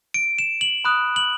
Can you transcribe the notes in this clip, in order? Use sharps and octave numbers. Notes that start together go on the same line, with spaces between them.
D7
E7
F#7
B5 D#6 F#6
F#7